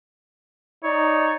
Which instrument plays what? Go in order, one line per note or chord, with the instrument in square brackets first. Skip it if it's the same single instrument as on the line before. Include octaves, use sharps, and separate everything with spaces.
[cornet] D#4 [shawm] C#5 [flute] D5